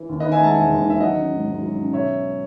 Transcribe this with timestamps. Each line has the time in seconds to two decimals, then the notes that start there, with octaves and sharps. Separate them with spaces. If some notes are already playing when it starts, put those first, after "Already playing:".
Already playing: E3
0.09 D#2
0.20 B4 D#5
0.25 D#3
0.32 E5 G#5
0.40 G#3 F#5 A5
0.55 E1 E5 G#5
0.70 D#2
0.85 D#3 E5
1.00 F#3 D#5 F#5
1.16 C#4
1.32 G#2
1.47 G#2
1.63 F#3
1.78 C#4
1.93 B2 C#5 E5